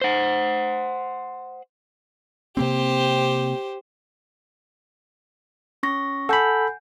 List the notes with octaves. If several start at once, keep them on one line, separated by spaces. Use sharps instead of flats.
C5 F#5
C3 A#3 C4 G4 C5
C#4 C#6 A#6
A4 F#5 G#5 B5 G6